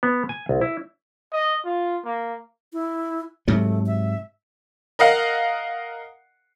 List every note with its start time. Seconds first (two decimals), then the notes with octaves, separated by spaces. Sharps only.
0.03 B3
0.29 G#5
0.49 C2
0.61 E4
1.33 D#5
1.65 F4
2.05 A#3
2.73 E4
3.48 G#2 C3 F#3 A3
3.86 E5
4.99 A#4 D#5 F5 F#5